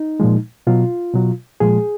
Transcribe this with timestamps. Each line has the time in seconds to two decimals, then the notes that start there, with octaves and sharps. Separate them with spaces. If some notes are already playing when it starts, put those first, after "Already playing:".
Already playing: D#4
0.20 A#2 F3 G#3
0.67 B2 F#3 F4
1.14 B2 F#3
1.60 A#2 F3 G#3 G#4